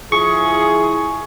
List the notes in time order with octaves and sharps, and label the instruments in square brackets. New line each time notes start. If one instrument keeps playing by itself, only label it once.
[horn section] F3 E4 G#4 [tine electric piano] C#6